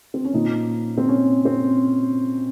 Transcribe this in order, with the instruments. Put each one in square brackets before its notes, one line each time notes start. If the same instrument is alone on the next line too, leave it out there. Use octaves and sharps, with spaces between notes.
[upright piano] C4
C#4
A#2 F3 D#4
C4
C#4
C4